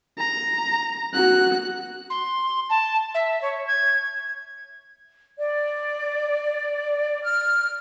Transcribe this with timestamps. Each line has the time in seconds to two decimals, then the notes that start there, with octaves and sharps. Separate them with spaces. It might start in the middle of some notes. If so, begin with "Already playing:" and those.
0.18 A#5
1.14 F#4 F#6
2.10 C6
2.70 A5
3.15 E5
3.42 C#5
3.67 G#6
5.39 D5
7.22 F6